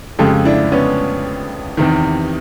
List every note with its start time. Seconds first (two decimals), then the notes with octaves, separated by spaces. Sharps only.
0.19 F2 C#3 F3 G#3 G4 A4
0.45 D4 E4
0.72 B3 C#4
1.77 E2 C3 D#3